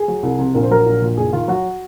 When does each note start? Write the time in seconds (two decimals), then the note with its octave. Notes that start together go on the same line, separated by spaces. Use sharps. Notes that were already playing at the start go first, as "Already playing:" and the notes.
Already playing: G#4
0.08 F#3
0.23 C2
0.39 C3
0.55 A#1 A#4
0.63 C5
0.71 F#3 A#4
0.86 A#1
1.02 A#2
1.17 F#1 G#4
1.33 D#3 F4
1.48 F#3 F#4